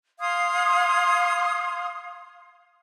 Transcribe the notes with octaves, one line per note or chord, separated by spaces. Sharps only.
F5 C6 D#6 G#6